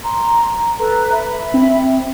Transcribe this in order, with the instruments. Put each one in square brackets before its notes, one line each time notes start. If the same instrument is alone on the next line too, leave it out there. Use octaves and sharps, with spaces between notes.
[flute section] A#5 C6
A4 B4 A#5
E5 B5
[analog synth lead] C4